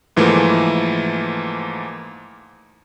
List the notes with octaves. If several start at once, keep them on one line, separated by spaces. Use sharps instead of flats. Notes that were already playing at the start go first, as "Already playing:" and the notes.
G#2 E3 F3 A3 A#3